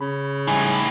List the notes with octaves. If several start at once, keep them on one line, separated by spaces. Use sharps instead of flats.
C#3 B5
A2 E3 G3 D#4 G#5